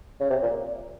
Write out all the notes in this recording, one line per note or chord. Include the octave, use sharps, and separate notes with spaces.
C#3
C3
A#2